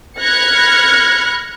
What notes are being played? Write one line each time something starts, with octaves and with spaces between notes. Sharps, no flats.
B5 F6 F#6 G#6 A#6 C#7